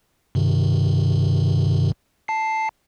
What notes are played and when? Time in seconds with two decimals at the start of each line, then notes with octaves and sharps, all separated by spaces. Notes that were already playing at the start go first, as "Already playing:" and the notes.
0.35 G2 C3 D#3
2.28 A5 C7